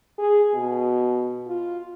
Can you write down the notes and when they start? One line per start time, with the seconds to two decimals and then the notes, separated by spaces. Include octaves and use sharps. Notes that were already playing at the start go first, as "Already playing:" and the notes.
0.18 G#4
0.54 B2
1.47 F4